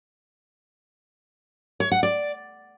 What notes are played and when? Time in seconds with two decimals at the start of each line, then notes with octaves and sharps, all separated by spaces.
1.80 C#5
1.91 F#5
2.03 D5